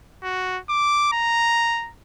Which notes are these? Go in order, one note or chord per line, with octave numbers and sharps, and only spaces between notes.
F#4
D6
A#5